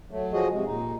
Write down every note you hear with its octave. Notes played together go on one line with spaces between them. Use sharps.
F#3 A3
F3 F#4 G#4 D#5
C3 G#3
A#2 D#4